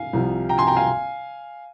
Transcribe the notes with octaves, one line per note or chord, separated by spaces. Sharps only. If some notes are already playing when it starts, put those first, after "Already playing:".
Already playing: F5 G#5
C2 C3 F3
G5 A#5
G#5 C6
G5 A#5
F5 G#5